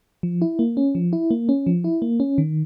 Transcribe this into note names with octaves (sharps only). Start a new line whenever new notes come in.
F3
E4
A#3
C#4
F3
E4
A#3
C#4
F3
E4
A#3
C#4
D#3